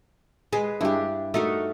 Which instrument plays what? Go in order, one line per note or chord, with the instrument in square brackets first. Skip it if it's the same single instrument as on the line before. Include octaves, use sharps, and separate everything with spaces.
[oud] G#3 [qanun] B4
[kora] G2 E4 [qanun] D4 G4
[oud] A3 [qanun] D#4 F#4 A#4 [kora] E5